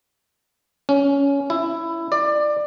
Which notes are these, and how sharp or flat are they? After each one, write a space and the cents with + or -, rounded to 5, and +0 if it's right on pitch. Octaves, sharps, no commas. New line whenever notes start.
C#4 +15
E4 +15
D5 +20